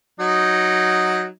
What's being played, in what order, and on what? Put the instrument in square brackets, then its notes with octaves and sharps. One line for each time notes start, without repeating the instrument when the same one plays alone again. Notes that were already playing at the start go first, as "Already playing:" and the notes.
[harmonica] F#3 D#4